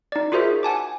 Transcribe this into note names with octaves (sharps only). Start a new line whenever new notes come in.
D#4 D5
F4 F#4 G#4 A#4 C5 E5
F#5 G#5 A5 D6